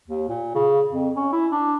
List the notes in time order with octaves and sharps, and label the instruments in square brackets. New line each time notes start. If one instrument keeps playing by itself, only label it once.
[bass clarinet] D#2
A#2
C#3
F2
C#4
E4
D4